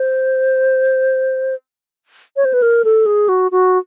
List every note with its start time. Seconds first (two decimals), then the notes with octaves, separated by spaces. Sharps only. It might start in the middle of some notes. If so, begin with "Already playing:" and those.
Already playing: C5
2.36 C#5
2.45 C5
2.53 B4
2.62 A#4
2.84 A4
3.06 G#4
3.29 F#4
3.51 F#4